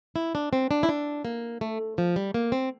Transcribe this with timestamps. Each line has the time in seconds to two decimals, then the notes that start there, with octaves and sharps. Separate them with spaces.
0.16 E4
0.35 D4
0.53 C4
0.71 D4
0.83 E4
0.89 D4
1.25 A#3
1.61 A3
1.98 F3
2.16 G3
2.34 A#3
2.52 C4